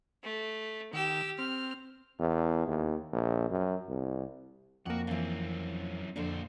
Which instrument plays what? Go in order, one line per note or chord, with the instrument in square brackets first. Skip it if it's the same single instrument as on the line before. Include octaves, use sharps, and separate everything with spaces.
[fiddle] A3
[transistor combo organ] D#3 [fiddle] G4 E6
[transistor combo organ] C4 [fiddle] F6
[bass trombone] E2
D#2
A#1
F#2
C2
[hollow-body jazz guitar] F2 A#3 [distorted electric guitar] F#4 F#5
[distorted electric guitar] F#2 C4 [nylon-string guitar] E3 F5
[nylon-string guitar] F2 D3 D4 [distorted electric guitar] A#2 C5